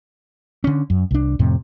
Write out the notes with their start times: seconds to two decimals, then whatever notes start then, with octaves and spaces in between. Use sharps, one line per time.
0.64 D3 C#4
0.90 F#2
1.11 C2 D4
1.39 F2 A2 C3